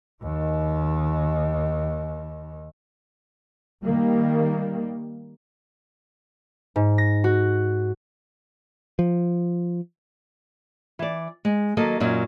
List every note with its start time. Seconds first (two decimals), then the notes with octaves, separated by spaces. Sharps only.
0.23 D#2 D#3
3.83 D#3 G3 A#3
6.76 G#2
6.98 A#6
7.24 F#4
8.99 F3
10.99 E3 D5
11.45 G#3
11.77 D#3 F#3 A#3 A4 D#5
12.00 F#2 A#2 F#3 C#4 D#4